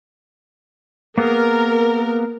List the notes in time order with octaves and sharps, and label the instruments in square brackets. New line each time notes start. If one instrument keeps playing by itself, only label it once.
[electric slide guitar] A#3 B3 G#4 [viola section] A#4